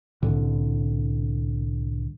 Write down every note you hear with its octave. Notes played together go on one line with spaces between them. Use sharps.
C2 A2 D3